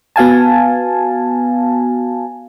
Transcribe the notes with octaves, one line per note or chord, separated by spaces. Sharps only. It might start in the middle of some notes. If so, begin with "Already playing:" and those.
B3 F#4 F5 G#5 A5